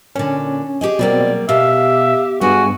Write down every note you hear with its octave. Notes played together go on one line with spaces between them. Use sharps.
A#2 D3 C#4
G4 G#4 D#5
B2 F#3 G3 A#3 C4 D5
B2 G4 E5 F5
G2 G#3 B3 F#4 G#5